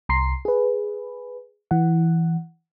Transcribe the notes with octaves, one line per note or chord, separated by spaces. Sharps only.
C2 A#5 C6 C7
G#4 B4
E3 F#5